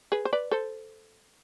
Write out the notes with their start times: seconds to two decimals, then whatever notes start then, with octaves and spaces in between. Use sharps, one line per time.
0.12 G#4 B4
0.25 C5
0.33 B4 D5
0.51 A4 C5